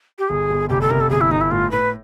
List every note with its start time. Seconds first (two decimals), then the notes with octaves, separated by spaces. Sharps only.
0.19 G4
0.29 G1 G#4
0.50 G1
0.69 F1 G4
0.81 A4
0.90 C3 A#4
1.01 A4
1.11 G1 G#4
1.21 E4
1.31 G1 D#4
1.41 E4
1.51 A2 F4
1.71 A2 B4